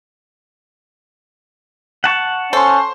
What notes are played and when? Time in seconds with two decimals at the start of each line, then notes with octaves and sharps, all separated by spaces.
2.04 F#5 A5 C#6
2.53 C#4 A4 C5 C6